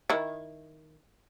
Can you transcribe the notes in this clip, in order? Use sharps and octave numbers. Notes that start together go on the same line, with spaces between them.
D#3 E4